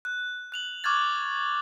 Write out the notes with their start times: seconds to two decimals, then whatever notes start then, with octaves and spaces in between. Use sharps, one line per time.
0.05 F#6
0.52 F#6 F7 F#7
0.84 C#6 D6 F6 F#6 G#6 A6